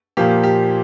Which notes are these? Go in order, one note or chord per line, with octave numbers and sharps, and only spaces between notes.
A#2 F3 A#3 G4
G4